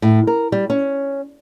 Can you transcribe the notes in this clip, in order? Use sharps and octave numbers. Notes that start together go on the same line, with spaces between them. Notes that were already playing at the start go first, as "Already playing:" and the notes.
A2
A#4
G3
C#4